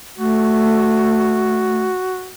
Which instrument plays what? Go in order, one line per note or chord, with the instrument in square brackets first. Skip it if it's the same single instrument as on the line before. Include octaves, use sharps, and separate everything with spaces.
[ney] A3 [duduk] F#4